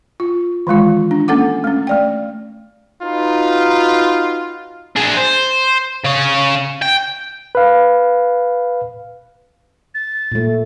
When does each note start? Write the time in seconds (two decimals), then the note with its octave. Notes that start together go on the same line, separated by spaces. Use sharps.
0.20 F4
0.67 D#3 E3 G#3 F4
1.11 D4
1.28 A#3 C#4 A4 F#5 D6
1.64 A3 C#4
1.87 A3 D5 G5
3.03 D#4 F4 F#4 B4
4.96 D4 G#4
5.17 C5
6.05 C#3 C#5
6.82 G5
7.55 B4 F5
9.95 A6
10.32 A#2 A3